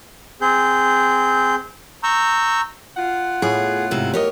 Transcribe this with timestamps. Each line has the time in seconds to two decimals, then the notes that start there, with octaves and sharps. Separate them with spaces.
0.41 C4 G#4 G6
2.03 A#5 C#6 E6 G6
2.97 F4 F#5
3.42 A2 B3 G#4
3.91 G#2 C3 E4
4.14 G4 A#4 C#5 D#5